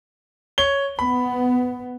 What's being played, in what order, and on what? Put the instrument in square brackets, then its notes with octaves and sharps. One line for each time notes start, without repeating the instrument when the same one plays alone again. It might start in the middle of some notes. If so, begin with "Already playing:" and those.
[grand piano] C#5 G7
[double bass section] B3 [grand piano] B5